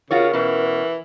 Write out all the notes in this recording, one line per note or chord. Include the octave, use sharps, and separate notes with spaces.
C#3 F4 F#4 A#4 C#5
B2 E3 C#4